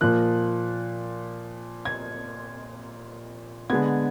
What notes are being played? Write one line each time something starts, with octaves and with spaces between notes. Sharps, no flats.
A#2 F3 A#3 F#6
G#6
D3 G#3 B3 G#6